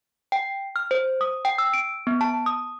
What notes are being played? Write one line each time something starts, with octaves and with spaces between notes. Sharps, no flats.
G5
F6
C5
D#6
G5
E6
D7
B3
A5
D#6